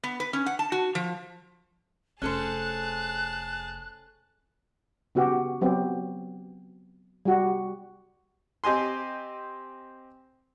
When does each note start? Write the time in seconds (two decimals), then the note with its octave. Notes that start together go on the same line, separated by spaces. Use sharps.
0.03 B3
0.20 B4
0.33 C#4
0.46 F#5
0.59 A5
0.72 F#4
0.95 F3
2.22 F1 C#4 G#4 A4 C5 A5 F#6
5.15 C#3 B3 F#4 G4
5.61 F#3 B3 C4 G4
7.25 G3 F#4
8.64 C4 G4 D#5 G#5 C6